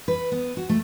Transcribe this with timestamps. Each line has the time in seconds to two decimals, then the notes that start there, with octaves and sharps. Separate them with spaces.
0.08 B4
0.32 B3
0.57 F#4
0.69 A3